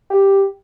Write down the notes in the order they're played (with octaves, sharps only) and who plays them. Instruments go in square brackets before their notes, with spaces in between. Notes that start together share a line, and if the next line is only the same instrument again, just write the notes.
[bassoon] G4